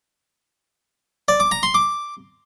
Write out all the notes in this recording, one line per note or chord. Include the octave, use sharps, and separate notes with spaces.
D5
D6
A#5
C6
D6